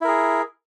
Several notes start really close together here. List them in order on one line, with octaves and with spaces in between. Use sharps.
E4 A#4 G#4